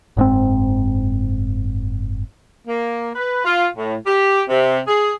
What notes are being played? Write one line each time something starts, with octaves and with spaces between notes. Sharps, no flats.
F#1 G#2 C4
A#3
B4
F4
A2
G4
C3
G#4